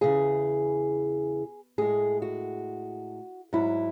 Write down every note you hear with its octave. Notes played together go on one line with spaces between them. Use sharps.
E2 C#3 E3 G#4
A2 G#3 G#4
F#4
G#2 F#3 E4